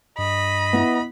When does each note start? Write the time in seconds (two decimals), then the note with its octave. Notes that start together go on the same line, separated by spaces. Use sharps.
0.18 G2 D#5 B5
0.73 B3 E4